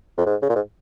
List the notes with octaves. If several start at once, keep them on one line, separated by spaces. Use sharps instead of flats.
F2
G#2
C#3
A#2
G#2